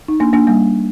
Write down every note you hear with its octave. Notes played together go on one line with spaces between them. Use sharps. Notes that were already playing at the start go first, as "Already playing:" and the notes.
D#4
A#3 D4
A#3 D4
G3 A#3